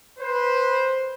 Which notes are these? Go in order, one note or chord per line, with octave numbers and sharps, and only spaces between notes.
B4 C5